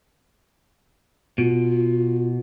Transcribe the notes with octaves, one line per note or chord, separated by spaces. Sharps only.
B2 F4